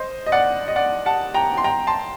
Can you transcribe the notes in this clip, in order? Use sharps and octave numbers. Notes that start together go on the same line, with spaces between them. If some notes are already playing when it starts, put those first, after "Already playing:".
Already playing: C5 D#5
D#5
D5 F#5
D#5
D5 F#5
F#5 A5
G5 A#5
C6
G5 A#5
A5 C6